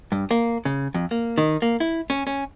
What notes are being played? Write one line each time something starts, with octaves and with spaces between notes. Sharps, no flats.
G2
A#3
C#3
F2
A#3
D#3
A#3
E4
C#4
C#4